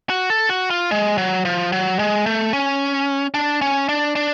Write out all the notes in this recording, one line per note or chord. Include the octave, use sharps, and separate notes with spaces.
F#4
A4
F#4
F4
G#3
F#3
F3
F#3
G#3
A3
C#4
D4
C#4
D4
D4